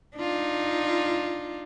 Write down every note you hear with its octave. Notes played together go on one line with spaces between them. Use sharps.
D4 D#4 F4